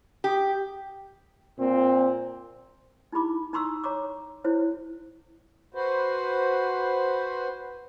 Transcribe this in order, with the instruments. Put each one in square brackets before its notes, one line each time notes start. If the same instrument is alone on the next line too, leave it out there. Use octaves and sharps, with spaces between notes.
[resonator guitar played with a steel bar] G4
[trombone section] A#2 C4
[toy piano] D#4 E4 G4 B5 D6
D#4 A#5 C6 C#6 D#6 E6
C#5 A#5 C#6 D6
E4 C5 C#5
[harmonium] F#4 B4 C5